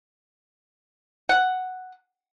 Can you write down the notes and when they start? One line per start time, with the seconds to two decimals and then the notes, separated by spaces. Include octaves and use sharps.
1.29 F#5